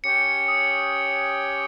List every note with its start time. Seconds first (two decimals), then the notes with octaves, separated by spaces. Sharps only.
0.04 C#4 G4 C#5 G5 C#7
0.48 D#6